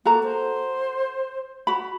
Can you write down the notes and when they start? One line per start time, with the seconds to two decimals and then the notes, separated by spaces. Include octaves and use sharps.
0.05 A#3 F#4 A4 A#5
0.23 C5
1.67 F#4 B5